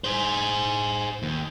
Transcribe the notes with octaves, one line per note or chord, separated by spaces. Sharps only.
G#4 C5
D#2